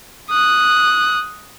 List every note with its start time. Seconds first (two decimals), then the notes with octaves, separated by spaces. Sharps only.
0.30 D#6 F#6